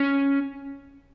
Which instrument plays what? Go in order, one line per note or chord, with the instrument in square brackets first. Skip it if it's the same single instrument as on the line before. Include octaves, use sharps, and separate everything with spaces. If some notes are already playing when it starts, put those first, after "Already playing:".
Already playing: [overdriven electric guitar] C#4